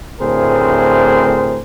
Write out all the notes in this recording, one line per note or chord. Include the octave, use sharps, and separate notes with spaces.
D2 A2 C4 G#4 A#4 C5